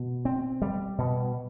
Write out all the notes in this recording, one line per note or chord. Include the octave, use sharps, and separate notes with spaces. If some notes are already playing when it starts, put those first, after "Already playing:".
Already playing: B2
C4
G3
B2